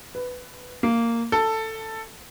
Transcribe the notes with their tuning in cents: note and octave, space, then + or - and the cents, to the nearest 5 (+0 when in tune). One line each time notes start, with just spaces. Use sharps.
B4 +10
A#3 -10
A4 +10